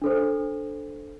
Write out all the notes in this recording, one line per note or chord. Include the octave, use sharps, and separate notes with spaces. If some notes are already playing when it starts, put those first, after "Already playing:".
D4 A4 C5